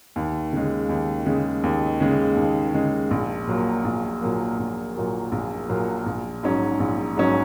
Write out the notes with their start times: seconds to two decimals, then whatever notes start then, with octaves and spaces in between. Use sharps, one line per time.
0.16 D#2
0.53 C#3 G#3
0.89 D#2
1.26 C#3 G#3
1.64 D#2
2.00 C#3 G#3
2.37 D#2
2.74 C#3 G#3
3.11 A#1
3.47 A#2 F#3 A#3
3.85 A#1
4.21 A#2 F#3 A#3
4.58 A#1
4.95 A#2 F#3 A#3
5.32 A#1
5.69 A#2 F#3 A#3
6.06 A#1
6.43 G#2 F#3 C#4
6.80 A#1
7.17 G#2 F#3 C#4